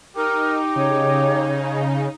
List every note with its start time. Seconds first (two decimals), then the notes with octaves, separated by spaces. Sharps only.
0.16 D#4 G4 A#4
0.76 C#3 C#5